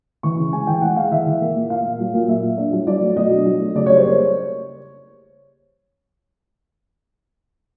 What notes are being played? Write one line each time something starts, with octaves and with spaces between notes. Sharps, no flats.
E3 C#6
C#3
G#3 G#5
E3 G5
G#3 F#5
G#3 F5
E3 E5
E3
A#3
A#2
A#2 F5
A#2
F#3
A#2
A#3 E5
A#2
D4
F#3
F#3 D5
A3
B2 D#5
D4
F#3
A3
C#3 D5
G3 C#5
C5
A#3 C#5